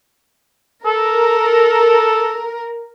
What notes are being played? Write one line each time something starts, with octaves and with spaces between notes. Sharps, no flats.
A4 A#4